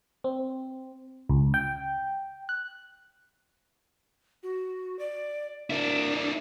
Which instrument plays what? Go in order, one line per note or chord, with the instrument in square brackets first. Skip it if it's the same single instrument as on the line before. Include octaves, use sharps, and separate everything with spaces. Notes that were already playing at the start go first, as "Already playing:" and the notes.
[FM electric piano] C4
C#2
G5
F#6
[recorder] F#4
D5
[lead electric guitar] D4 E4 [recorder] A#4